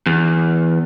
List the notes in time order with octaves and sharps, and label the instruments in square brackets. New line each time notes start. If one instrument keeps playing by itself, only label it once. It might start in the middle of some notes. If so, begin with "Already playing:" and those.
[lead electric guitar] E2